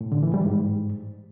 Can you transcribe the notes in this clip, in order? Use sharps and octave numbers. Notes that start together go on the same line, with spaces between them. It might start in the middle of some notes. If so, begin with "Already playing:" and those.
A2
D3
E3
G3
G#2